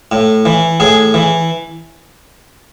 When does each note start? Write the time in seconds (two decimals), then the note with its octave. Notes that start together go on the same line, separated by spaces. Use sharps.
0.12 A2
0.45 E3
0.80 A2 G#4
1.14 E3